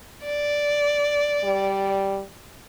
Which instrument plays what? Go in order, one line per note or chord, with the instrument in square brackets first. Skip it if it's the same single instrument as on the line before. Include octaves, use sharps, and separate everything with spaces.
[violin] D5
[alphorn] G3